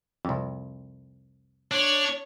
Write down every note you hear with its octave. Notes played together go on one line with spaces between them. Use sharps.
C2 F2
D4 C#5